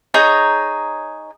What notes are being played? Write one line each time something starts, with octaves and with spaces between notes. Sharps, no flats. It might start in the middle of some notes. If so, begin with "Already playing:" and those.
D#4 G#4 C#5 A#5